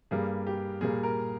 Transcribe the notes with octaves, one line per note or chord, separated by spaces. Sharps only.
G2 G3 A#3 G#4
G4
A#2 G3 A#3 G#4
A#4